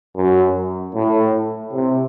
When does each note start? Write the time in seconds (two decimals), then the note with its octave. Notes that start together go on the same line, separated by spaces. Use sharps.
0.16 F#2
0.95 A2
1.73 C3